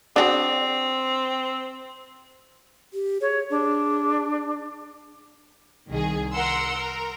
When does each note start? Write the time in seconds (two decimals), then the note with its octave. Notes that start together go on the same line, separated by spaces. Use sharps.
0.16 C4 D4 F#4 G#4
2.93 G4
3.21 G#4 C#5
3.50 D4 G#4
5.88 C2 D#3 G#4
6.33 A#4 F#5 C6 E6
6.75 A#4